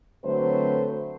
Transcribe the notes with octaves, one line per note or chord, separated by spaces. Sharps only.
D3 F#3 A3 C4 B4 C5